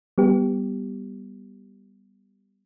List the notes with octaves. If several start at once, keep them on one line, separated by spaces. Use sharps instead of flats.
G3 B3 G4